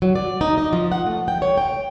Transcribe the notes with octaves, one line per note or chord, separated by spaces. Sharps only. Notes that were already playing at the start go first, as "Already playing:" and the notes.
F#3
D5
D#4
D#5
F3
F#5
A3
G5
C#5
G5